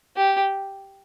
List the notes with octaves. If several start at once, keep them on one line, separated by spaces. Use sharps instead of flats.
G4